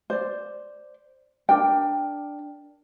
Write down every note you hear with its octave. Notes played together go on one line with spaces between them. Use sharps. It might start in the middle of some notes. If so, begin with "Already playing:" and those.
C5 D5
D4 A#4 G5